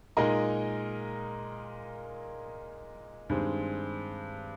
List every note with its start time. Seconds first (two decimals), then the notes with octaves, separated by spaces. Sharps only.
0.17 A#2 G#3 D#4 A#4 D#5
3.29 G2 D#3 G#3 C4